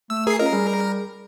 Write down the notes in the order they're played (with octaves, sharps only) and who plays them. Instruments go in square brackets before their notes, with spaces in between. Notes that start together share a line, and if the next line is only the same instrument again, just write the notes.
[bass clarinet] A3 [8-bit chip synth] E6
[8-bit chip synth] G#4 C7 [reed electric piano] A#4
[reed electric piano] C#4 F4 D#5 [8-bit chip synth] A#4
[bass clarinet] G3 [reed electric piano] G#4